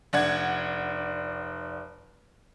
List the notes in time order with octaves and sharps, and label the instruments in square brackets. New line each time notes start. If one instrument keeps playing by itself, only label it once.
[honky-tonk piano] F1 D4 F#5 G#6